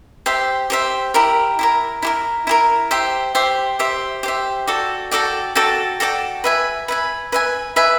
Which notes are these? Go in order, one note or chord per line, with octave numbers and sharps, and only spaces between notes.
G4 C5 E5
G4 C5 E5
E4 G4 A#4
E4 G4 A#4
E4 G4 A#4
E4 G4 A#4
G4 C5 E5
G4 C5 E5
G4 C5 E5
G4 C5 E5
F#4 A4 D5 G5
F#4 A4 D5 G5
F#4 A4 D5 G5
F#4 A4 D5 G5
B4 E5 G#5
B4 E5 G#5
B4 E5 G#5
B4 E5 G#5